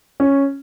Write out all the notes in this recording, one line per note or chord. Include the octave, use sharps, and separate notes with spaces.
C#4